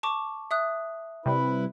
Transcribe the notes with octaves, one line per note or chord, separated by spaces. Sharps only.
A5 C#6 D6
E5 D#6 F#6
C3 G3 E4 B4